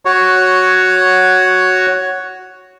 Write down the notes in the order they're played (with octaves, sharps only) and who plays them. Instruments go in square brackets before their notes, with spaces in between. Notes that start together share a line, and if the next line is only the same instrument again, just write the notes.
[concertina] F#4 C#5